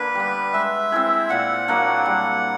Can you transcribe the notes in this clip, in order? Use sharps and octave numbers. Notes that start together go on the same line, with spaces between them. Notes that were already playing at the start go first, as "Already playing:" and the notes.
Already playing: D3 A#3 B4
G3 B3
G#3 E5
C4 E4 G#4
A#2 F#5
F#3 A#3 D4
G3